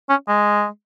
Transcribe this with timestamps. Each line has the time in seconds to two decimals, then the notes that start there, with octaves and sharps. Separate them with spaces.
0.09 C#4
0.28 G#3